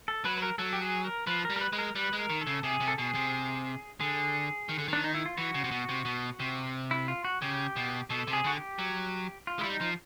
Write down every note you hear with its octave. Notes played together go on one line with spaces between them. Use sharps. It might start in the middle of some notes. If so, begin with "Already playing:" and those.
A4
F#3 B4
B4
A#4
F#3 A4
G4
G#4
A#4
F3 B4
A#4
G3
A#4
B4
G#3 B4
A#4
G3 B4
G#3
A#4
D#3
A4
C#3
C3 G#4
C3
A4
B2 G#4
C3
D3 G#4
D#3
D3
D#3 D4
D#4
E4
F4
E3 F#4
C#3
C3
B2
C3
B2
C3
E4
F4
F#4
C#3 G4
B2
B2 A4
C3
G#4
D3 F#4
G4
F#3
F4
G3 G#3 E4
D#4
F3